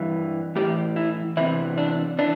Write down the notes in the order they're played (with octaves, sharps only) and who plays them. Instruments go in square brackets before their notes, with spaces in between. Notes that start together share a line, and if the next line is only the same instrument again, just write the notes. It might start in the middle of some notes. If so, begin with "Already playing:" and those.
Already playing: [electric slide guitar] G2 E3
A2 E3 G4
E4
E2 C3 E3 E4
D4
E3 D4